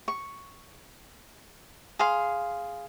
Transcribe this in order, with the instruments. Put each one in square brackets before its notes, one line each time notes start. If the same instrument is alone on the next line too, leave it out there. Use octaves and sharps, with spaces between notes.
[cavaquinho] C#6
G#4 F5 C6